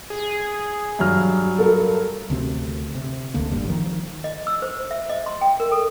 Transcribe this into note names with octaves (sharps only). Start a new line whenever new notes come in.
G#4
G2 F#3 F6
A4 A#4
D2 C3 C4
C3
E1 C#2 D3 A#3
D1 G#1 G2 G3
D#3 F3
D#5
E6
C5
E5
D#5
C6
G5
A#4
A4